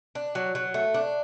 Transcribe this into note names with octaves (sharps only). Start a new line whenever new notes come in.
D4
F#3
F#3
A3
D4